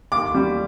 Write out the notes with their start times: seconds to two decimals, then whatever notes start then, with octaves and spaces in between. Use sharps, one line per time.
0.12 D#2 D6
0.35 G3